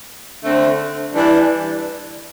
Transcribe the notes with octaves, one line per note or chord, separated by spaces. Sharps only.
D3 A3 C4
E3 G3 D4